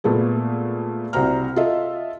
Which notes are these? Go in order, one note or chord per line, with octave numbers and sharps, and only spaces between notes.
A#2 A3 B3 G#4
C2 F#4 C5 A#5 F6
F4 A4 D#5 E5